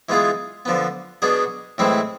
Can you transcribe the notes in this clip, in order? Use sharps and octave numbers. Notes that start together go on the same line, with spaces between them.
E3 G#3 B3 F4 G#4
D3 F3 B3
B2 B3 D4 G#4
A2 E3 G#3 C4 E4